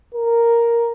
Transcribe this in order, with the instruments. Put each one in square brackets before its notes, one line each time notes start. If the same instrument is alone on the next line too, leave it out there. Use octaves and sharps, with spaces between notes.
[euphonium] A#4